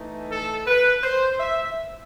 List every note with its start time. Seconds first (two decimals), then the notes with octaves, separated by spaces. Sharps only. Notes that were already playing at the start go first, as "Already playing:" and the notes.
Already playing: E3 A3 D#4
0.31 A4
0.67 B4
1.03 C5
1.40 E5